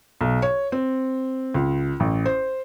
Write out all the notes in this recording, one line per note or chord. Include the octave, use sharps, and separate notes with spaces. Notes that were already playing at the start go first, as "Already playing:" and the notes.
B1
C#5
C4
C#2
A1
C5